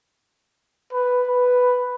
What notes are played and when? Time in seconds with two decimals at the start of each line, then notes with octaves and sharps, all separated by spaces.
0.92 B4
1.27 B4